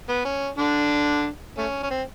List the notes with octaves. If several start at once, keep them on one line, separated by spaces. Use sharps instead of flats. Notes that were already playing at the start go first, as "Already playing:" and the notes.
B3
C#4
D3 D4
A3 C#4
C#4
C4